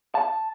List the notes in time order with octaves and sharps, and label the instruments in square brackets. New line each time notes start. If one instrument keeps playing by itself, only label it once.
[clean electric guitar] A5